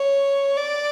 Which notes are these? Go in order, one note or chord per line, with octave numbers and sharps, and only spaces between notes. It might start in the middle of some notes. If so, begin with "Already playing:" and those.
Already playing: C#5
D5